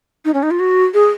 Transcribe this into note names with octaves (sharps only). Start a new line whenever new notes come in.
D#4
C#4
D#4
F4
F#4
G#4